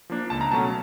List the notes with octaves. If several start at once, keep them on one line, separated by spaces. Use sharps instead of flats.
F3 A#3 D4
C#2 A5
A#5
B2 F#3 A3 C#4 A5